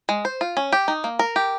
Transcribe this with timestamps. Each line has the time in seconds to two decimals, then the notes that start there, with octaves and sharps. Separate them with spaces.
0.09 G#3
0.25 C5
0.41 F4
0.57 C#4
0.72 G4
0.88 D#4
1.04 A#3
1.19 A#4
1.36 G4